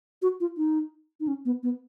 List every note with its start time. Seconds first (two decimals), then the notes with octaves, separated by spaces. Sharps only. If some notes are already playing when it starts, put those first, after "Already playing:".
0.22 F#4
0.40 F4
0.57 D#4
1.20 D#4
1.27 C#4
1.45 B3
1.63 B3